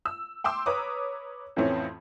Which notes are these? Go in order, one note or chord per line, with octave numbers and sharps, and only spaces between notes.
E6
G5 C6 D6 E6
B4 C#5 A#5 D6 D#6
F2 A2 E3 A3 C4 C#4